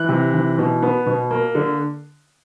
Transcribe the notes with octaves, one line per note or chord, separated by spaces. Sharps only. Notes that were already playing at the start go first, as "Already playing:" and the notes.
Already playing: E3 F#6
C3
E3
B2
B3
B2
A#3
D3